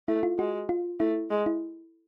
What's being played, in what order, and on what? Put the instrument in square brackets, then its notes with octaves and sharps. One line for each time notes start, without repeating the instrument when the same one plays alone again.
[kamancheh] A3 [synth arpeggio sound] E4
[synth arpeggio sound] F4
[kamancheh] G#3 [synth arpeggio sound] F#4
[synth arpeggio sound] F4
[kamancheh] A3 [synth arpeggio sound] E4
[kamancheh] G#3
[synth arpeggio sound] E4